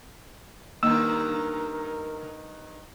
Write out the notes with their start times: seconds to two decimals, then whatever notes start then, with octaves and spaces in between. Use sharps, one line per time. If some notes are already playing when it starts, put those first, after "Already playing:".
0.83 G2 D#3 A#3 A#4 E6